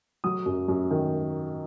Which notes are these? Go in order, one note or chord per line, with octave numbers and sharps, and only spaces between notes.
F#3 D#6
F#2
F#2
D#3